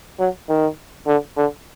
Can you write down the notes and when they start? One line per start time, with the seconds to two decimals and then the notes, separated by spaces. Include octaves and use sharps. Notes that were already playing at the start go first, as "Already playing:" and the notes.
0.19 F#3
0.49 D#3
1.07 D3
1.37 D3